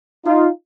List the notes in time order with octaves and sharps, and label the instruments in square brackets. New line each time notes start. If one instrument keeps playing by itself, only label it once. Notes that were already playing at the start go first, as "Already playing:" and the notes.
[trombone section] D#4 F4